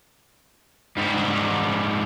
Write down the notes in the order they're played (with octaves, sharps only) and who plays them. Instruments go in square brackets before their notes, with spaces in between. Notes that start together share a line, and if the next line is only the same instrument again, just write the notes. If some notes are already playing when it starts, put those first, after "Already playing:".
[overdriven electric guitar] G#2 G3